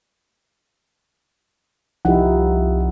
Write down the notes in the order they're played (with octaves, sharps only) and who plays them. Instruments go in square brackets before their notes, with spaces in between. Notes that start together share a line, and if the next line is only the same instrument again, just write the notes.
[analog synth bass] C2 [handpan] F3 D#4 E4 [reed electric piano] G4 F#5